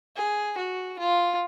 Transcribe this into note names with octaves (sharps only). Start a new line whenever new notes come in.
G#4
F#4
F4